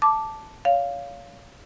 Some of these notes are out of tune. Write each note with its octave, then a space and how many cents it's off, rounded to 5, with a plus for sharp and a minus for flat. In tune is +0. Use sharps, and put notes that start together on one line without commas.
A5 +0 D6 +0
C#5 +35 F5 +0